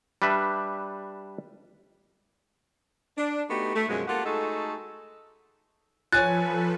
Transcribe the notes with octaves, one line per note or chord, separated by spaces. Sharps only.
G3 D4 B4 E5
D4
A3 B3 D#4 F#4 G4
A3
F#2 B2 F3 G#3
A#3 F4 G4 A4 F#5
G#3 A3 D#4 F#4 G#4 A4
F3 F4 A4 B4 C#5 G#5 F#6 A6